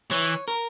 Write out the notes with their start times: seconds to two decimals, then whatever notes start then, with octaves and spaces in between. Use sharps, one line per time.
0.11 E3 C#5
0.48 A#4